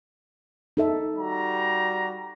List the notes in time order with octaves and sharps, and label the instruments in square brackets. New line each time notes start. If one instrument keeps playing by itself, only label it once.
[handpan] D#4 A4 E5
[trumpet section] G3 F#4 A#5